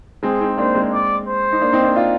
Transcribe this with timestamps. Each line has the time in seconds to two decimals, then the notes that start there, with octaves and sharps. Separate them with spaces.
0.23 G#3 C4 G#4
0.40 C4 D#4
0.58 A#3 D4 C5
0.75 G#3 C4
0.93 D5
1.27 C5
1.52 D#4
1.61 A#3 D4
1.73 C4 D#4
1.84 A#3 D4
1.96 D4 F4